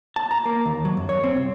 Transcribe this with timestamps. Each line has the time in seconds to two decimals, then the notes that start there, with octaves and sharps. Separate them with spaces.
0.16 A5
0.31 A#5
0.46 A#3
0.66 D#2
0.85 F#3
0.97 F#2
1.09 C#5
1.24 C4
1.36 C2